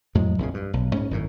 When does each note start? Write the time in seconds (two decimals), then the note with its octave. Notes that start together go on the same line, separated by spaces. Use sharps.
0.15 F2 A2 F#3 G#3
0.38 A#1 F2 C#3
0.54 G2
0.73 B1
0.94 G#2 C#4
1.11 G#1 F#2 A2